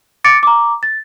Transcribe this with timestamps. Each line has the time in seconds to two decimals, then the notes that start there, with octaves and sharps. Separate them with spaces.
0.24 D6 A6 C#7 D7
0.43 A#5 D6
0.83 A6